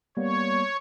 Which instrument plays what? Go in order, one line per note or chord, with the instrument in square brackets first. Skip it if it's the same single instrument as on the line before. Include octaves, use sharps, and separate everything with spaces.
[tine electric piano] G3 A#3 B3 [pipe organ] C#5